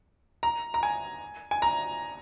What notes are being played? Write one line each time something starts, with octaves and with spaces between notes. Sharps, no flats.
A#5
A#5
G#5
G#5
A#5